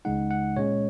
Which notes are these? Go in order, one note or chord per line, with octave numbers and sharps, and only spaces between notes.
C#2 C#3 G#3 D#4 F#5
F#5
A#2 G#3 C#4 C#5